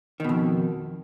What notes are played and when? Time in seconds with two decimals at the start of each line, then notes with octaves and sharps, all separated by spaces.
0.20 D#3
0.24 B2
0.29 F2